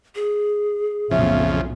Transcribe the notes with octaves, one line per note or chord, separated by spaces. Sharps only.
G#4
B1 F2 A2 C#3 E5